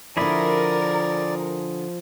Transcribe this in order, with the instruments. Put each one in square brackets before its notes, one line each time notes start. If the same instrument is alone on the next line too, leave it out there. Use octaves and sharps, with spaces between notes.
[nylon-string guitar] D3 E4 [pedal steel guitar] F3 G#4 B5 [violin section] A#4 [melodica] D5